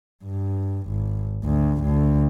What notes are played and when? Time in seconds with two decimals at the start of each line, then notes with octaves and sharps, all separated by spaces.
0.24 G2
0.88 G#1
1.44 D2
1.83 D2